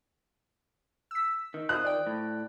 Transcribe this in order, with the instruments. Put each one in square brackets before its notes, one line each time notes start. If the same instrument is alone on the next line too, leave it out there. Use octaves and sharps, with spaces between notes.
[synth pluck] E6 B6
[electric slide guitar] D#3
[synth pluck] F4 C5 D#6 [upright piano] F#6
[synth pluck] D5 G5
[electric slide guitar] A2